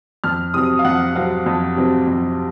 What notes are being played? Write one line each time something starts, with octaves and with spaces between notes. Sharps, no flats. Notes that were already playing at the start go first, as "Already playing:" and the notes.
F2 F6
C3 F#3 C4 D#6
F5
F2 F#5
C3 F#3 C4 F5
F2
C3 F#3 C4
F2